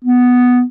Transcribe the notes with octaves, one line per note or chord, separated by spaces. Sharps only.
B3